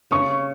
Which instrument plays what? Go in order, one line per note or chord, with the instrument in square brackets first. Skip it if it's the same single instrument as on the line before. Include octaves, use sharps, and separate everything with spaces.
[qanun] C#3 [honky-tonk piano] C#6